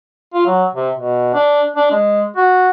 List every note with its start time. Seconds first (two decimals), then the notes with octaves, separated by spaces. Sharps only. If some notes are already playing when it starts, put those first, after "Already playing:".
0.34 F4
0.47 F#3
0.75 C3
0.96 B2
1.34 D4
1.76 D4
1.91 G#3
2.37 F#4